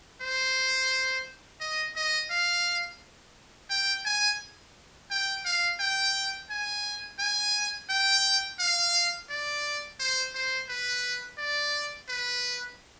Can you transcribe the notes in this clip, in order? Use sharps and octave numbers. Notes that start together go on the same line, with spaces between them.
C5
D#5
D#5
F5
G5
G#5
G5
F5
G5
G#5
G#5
G5
F5
D5
C5
C5
B4
D5
B4